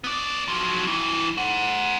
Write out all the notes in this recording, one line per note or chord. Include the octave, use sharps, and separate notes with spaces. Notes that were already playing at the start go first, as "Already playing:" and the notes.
B3 D5
F3 F#3
G2 E3
C5 F#5